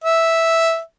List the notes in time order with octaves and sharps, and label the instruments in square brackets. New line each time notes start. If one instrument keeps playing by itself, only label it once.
[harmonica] E5